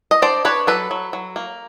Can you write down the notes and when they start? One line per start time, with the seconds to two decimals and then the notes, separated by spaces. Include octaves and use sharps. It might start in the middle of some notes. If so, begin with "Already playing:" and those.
0.11 D#5
0.22 D4 C5 D5
0.45 D4 B4 C#5
0.67 F#3 A4 B4
0.91 F#3
1.13 F#3
1.36 A#3